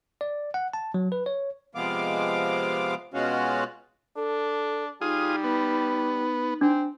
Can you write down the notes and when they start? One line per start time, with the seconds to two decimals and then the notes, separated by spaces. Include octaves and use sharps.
0.21 D5
0.54 F#5
0.74 A5
0.94 F#3
1.12 B4
1.26 C#5
1.75 C3 F3 G#3 B3 F5 D6
3.14 B2 G#3 C#4 F4 F#4
4.16 D4 A4
5.01 G3 D#4 F4 G#4 D#6
5.44 B3
6.61 C4 D4